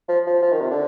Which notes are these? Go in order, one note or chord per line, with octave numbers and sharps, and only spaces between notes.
F3
F3
F3
D#3
C3
D3